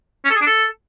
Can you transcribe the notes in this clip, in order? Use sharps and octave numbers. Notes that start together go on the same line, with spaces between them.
C#4
A4
G#4
D4
A4